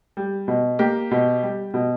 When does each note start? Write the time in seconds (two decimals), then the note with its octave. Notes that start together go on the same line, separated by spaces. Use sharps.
0.17 G3
0.48 B2
0.79 A#3 G4
1.11 B2
1.43 G3
1.74 B2